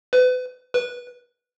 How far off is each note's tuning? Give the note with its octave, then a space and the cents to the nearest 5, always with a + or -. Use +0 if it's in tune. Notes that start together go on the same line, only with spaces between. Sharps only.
B4 +35
B4 -15